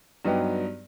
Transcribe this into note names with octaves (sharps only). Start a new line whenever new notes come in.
G2 F#3 B3 D#4 G4